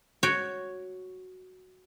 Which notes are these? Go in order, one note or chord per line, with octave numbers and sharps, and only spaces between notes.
F#4 C#5 G5